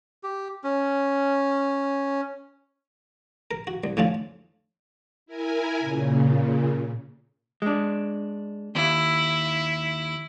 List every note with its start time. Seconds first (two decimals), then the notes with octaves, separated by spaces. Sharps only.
0.23 G4
0.64 C#4
3.51 A#4
3.67 F#4
3.84 C2
3.97 A2 F3 C#4 D4 F4
5.26 E4 A#4 G#5
5.79 A#2 C#3
7.62 G#3 D4
8.75 D#2 E4